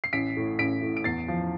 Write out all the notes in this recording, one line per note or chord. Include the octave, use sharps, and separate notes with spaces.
C7
A1 B6 D7
A2
A1 B6 D7
A2
D7
E2 A6 C7
F3